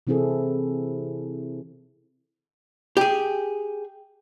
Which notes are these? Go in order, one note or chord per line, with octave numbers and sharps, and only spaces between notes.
C3 E3 C4 E4 G#4 A4
G4 G#4